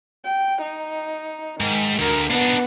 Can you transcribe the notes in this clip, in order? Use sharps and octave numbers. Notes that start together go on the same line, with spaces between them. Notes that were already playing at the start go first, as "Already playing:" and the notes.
G5
D#4
G#2 D#3
D2 A#4
B3 D4 D#4